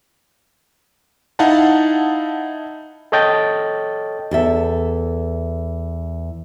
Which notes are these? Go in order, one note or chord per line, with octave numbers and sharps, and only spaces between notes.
D#4 E4 F5 F#5 A5
A4 C#5 D#5 G5 A5 A6
E2 A4 E5